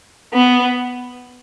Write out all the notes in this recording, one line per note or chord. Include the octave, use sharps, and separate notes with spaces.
B3